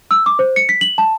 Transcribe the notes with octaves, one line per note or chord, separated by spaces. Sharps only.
E6
D6
C5
C#7
B6
F#7
A5